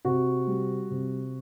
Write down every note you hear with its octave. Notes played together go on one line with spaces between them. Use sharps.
C3 F#4
G3
C3